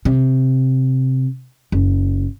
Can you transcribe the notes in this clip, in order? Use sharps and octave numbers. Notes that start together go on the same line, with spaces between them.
C3
F#1